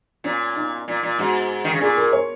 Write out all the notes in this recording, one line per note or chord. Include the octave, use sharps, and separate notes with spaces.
A#2 C#4
D#4
A#2
A#2
G#2 F#4
D#3
C#3
A#2 G#4
A#4
C#5